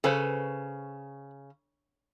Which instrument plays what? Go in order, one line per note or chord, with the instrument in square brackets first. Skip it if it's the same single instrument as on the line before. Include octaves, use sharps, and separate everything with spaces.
[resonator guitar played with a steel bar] C#3 [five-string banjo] A4 B4 C5